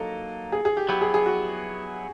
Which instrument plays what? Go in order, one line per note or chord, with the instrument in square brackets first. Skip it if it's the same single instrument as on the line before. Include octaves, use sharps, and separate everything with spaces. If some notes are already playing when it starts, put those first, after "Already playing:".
Already playing: [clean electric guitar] F#3 A#3 D#4 [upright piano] A4
[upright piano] G#4
G#4
G4
[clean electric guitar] F#3 B3 E4 [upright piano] G4
[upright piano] G#4
G#4
F#4